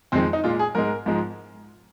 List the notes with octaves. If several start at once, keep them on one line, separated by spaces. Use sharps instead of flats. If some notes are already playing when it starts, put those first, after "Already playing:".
F2 D#3 G#3 C4
D#4
A#2 G#3 F4
G#4
G#2 G#3 A#4
G#2 F3 G#3